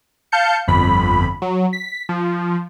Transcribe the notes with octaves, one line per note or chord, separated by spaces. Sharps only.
F5 A5 G6 C#7
G1 F2 B5
F#3
B6
F3